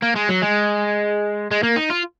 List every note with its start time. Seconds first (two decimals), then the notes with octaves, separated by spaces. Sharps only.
0.03 A#3
0.16 G#3
0.29 F#3
0.42 G#3
1.51 G#3
1.63 A#3
1.76 D#4
1.90 F4